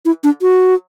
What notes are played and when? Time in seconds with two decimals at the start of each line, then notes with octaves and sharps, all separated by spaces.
0.05 E4
0.24 D4
0.42 F#4